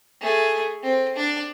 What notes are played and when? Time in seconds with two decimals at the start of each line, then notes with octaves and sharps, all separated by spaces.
0.21 A3 G#4
0.83 C4
1.16 D4